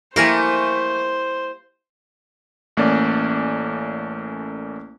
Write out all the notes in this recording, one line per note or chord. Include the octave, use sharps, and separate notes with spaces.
F3 A3 A#3 E4 G4 A#4 C5 G#5
A1 A3 A#3 C#4 D5